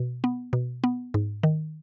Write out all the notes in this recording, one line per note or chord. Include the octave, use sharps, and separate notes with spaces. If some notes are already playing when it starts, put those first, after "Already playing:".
Already playing: B2
B3
B2
B3
G#2
D#3